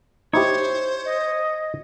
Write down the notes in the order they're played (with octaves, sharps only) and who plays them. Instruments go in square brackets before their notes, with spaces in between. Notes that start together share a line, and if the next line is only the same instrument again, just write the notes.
[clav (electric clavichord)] D#4 E4 G4 [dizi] C5 [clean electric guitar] C#5
[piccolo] D#5